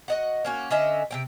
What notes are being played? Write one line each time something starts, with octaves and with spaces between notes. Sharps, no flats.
F#4 D#5 F#5
A#3 C#4 F#4
D3 C#4 D#5 E5
C3 C4 G5